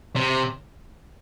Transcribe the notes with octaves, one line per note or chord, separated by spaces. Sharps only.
C3